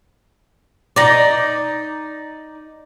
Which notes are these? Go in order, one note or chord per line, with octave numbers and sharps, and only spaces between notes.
D#4 D5